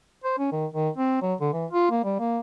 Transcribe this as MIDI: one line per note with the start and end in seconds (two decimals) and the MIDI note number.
0.24 0.35 72
0.38 0.50 61
0.52 0.66 51
0.74 0.89 51
0.97 1.18 60
1.22 1.34 54
1.41 1.51 50
1.53 1.66 52
1.71 1.86 65
1.91 2.01 58
2.04 2.18 55
2.19 2.40 58